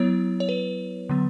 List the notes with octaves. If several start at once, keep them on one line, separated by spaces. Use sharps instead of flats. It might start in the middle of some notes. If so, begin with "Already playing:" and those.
Already playing: F#3 B3 E4 C#5
C#5
B4
D3 F#3 B3